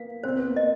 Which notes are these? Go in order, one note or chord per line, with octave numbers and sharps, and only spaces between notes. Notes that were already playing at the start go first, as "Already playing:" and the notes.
Already playing: A#3 B3 F5
C4 C5
B3
A#3
D#5